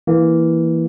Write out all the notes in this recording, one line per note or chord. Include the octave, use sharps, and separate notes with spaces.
E3 A#3